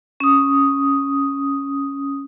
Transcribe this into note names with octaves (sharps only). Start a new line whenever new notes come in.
C#4 D#6